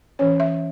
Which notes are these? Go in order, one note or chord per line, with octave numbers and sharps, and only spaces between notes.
E3 C#4 C#5
E5